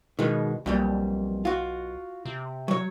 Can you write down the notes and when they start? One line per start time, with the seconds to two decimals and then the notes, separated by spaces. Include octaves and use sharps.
0.19 B2 D#3 G#3
0.66 B1 F2 A#2 G3
1.45 F4 F#4
2.25 C3
2.68 F#3 C#5